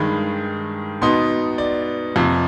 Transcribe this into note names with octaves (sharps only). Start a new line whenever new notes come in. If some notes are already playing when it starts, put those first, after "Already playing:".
Already playing: G2 D#3 G#3 B5
B2 B3 D#4 C6
D5
F2 C3 F3